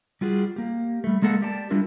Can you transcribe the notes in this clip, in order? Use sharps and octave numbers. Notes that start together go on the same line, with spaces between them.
G3 F4 F#4 G#4
A#3 G4
G3 A3
G#3 A#3 A4 F#5
G4 D5 G5 A5
G3 D4 E4 F4 A#4